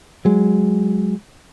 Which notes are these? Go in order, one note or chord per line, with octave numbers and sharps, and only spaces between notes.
F#3 G#3